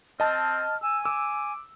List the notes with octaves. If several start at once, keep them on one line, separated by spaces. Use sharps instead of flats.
C4 D#5 A5 F6
G#5 E6
D6 E6